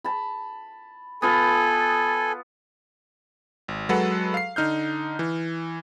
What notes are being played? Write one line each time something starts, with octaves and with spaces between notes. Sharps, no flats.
A5 B5
B3 F4 A4 G#5
G#1
F#3 G#3 A4 B4 F#5
F5 C7
D3 D#4 F6 G6
E3